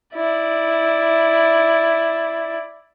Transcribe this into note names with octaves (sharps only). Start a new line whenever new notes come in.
E4 D5